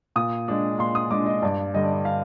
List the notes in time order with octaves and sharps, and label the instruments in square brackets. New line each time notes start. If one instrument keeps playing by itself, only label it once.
[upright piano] A#2 D#6
G#3 D4
A#2 C6
D#6
G#3 D4 D6
D#5
G2 D5
D3 G3 D#5
D5
D#5
F5